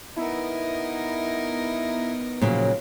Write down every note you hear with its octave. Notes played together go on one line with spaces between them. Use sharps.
B3 D#4 E4 A#4
A#2 C#3 F3 F#3